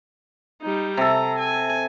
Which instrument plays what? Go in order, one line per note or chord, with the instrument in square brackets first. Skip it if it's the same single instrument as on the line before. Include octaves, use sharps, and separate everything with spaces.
[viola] G3 D#4
[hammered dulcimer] C3 A4 [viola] A#5
[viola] G#5